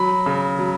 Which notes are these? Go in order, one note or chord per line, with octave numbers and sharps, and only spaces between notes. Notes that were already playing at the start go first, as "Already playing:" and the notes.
Already playing: F#3 B5
C#3
F#3